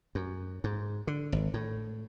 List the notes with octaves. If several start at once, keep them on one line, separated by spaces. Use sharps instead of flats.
F#2
G#2
D3
G#1
A2